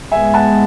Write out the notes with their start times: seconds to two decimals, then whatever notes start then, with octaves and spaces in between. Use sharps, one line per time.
0.11 G#2 G#3 B3 E5 G#5
0.34 F#5 A5